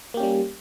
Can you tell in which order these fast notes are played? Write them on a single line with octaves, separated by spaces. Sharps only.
A#3 G4 C#4 G3